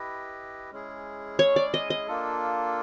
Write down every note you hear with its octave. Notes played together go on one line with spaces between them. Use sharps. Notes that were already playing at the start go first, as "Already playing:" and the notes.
Already playing: E4 G4 B4 D#5
G#3 C#4 E4 G#4
C#5
D5
D#5
D#5
A#3 D4 F4 A4